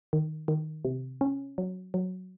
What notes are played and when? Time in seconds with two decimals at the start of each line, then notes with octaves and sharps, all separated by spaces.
0.13 D#3
0.48 D#3
0.85 C3
1.21 C#4
1.58 F#3
1.94 F#3